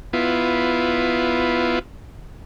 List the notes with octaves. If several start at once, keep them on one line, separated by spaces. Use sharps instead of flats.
B3 E4 F4